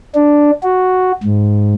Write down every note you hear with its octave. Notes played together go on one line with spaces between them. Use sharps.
D4
F#4
G#2